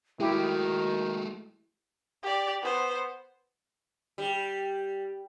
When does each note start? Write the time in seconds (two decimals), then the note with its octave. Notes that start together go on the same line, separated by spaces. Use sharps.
0.20 D#3 G#3 A3 E4 F#4 G4
2.23 G4 D5
2.62 B3 C5
4.18 G3